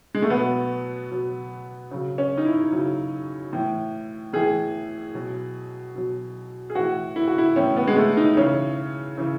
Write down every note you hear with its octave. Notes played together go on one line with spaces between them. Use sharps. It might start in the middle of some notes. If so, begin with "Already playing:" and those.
G#3
A3
B2 F#3 B3
B2 F#3
C#3 F#3
C#4
D#4
E4
C#3 F#3
A2 E3
A2 E3 G#4
B2 F#3
B2 F#3
G#4
A2 E3 F#4
E4
F#4
E4
A2 E3 C#4
B3
G#3
A3
D#4
C#3 E3 C#4
C#3 E3